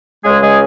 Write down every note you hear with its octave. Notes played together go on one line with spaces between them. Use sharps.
C#2 C#3 G#3 G#4
G#3 G#4